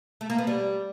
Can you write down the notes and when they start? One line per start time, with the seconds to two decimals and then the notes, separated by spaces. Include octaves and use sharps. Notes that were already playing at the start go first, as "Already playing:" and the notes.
0.21 A3
0.30 A#3
0.38 B3
0.47 G3